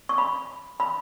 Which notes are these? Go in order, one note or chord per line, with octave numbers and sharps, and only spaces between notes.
C#6
B5
B5